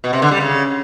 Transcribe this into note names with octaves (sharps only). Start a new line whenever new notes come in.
B2
C3
D3
G3
C#3